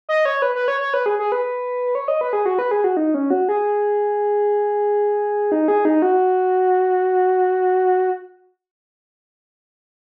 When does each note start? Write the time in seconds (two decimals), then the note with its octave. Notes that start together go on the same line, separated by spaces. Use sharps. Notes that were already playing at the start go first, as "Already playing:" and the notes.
0.09 D#5
0.25 C#5
0.42 B4
0.55 B4
0.68 C#5
0.81 C#5
0.94 B4
1.06 G#4
1.19 G#4
1.32 B4
1.95 C#5
2.08 D#5
2.21 B4
2.33 G#4
2.46 F#4
2.59 B4
2.71 G#4
2.84 F#4
2.97 D#4
3.14 C#4
3.30 F#4
3.49 G#4
5.52 D#4
5.68 G#4
5.85 D#4
6.02 F#4